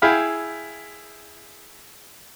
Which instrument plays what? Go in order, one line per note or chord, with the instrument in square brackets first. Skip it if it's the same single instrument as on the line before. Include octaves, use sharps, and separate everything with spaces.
[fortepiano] E4 G#4 E5 F5 G5 B5